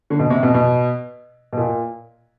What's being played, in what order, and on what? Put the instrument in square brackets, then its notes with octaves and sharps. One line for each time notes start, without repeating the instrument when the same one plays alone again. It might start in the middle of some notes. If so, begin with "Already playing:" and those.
[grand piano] D3
B2
C3
B2
B2
B2
A#2